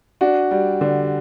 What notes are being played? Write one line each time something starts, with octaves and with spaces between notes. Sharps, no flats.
D4 F#4
G3
D3